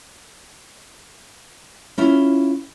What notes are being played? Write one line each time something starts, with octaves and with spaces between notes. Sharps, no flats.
C#4 E4 F4